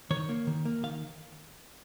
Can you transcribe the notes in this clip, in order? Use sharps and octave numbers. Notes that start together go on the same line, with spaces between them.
D#3 C#5
A#3
D#3
A#3
D#3 F5